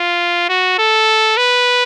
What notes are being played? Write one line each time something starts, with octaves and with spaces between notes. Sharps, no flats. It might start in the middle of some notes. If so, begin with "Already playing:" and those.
Already playing: F4
F#4
A4
B4